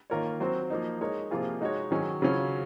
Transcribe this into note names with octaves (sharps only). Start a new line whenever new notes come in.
D#3 A#3 F4 A#4 C#5
F#3 C4 F#4 C5
F3 A#3 D#4
G#3 D#4 A#4 C#5
C3 F3 A#3 F4 G#4
G#3 D#4 F#4 C#5
D#3 F#3 C#4 G#4
C#3 F#3 C#4 F4